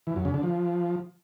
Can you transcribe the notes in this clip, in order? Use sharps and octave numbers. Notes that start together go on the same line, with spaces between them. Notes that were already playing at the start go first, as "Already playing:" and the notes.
E3
F#2
C#3
D3
F3